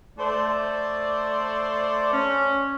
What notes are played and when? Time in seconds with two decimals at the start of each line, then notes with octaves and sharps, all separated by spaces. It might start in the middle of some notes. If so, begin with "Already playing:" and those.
0.18 A3 C5 D5
2.12 C#4